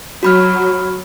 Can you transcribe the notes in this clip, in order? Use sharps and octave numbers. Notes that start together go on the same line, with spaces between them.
F#3 F#4 B5 F6